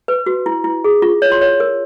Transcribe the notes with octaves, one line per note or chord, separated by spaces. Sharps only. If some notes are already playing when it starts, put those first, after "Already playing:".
B4
F#4
E4
E4
G#4
F4
C#5
C6
C#5
A#4